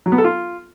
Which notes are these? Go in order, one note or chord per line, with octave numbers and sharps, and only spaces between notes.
F#3
B3
A4
F4